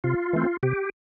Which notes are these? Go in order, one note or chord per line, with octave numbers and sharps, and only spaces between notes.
C3 F4
E3 A3 C4
C3 G4